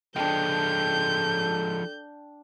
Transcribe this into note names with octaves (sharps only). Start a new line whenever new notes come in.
F3 G#3 D4 A4 G5 G6